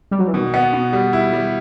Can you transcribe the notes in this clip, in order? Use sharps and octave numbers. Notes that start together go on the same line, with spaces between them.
G3
F#3
E3
B2 D#3
B3
B2
G3
E4
G3